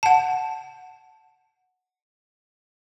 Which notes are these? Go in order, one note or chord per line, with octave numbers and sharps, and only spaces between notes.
F#5 A5